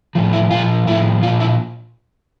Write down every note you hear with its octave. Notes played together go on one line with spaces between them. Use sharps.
A2 F3
E4
A#2 F3 F4
A2 F3 E4
A#2 F3 F4
E4